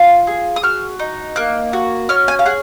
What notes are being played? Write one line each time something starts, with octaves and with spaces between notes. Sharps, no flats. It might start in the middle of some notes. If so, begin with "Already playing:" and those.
Already playing: F4
G#4
D#6
F#4 F6
D#4
A#3 F#6
F#4
C#4 F6
G#5
F5
G#4 F#5